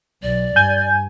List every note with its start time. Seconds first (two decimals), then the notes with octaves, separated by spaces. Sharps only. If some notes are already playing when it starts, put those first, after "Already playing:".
0.23 B1 D5
0.56 G2 G#5 G6